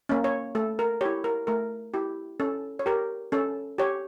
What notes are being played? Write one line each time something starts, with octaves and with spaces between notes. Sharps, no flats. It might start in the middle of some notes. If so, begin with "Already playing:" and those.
A#3 C#4
C#5
A3 A4
A#4
E4 G4 C#5
A#4
A3 A#4
E4 G4
C#4 A4
C#5
G4 A#4
C#4 A4
G4 C#5